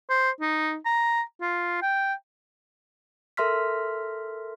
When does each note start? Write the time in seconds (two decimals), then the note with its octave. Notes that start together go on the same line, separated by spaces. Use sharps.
0.10 C5
0.41 D#4
0.86 A#5
1.41 F4
1.82 G5
3.37 A4 A#4 E5 C6 F6 B6